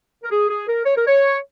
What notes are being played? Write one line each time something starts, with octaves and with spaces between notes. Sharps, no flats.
A#4
G#4
G#4
A#4
C#5
A#4
C#5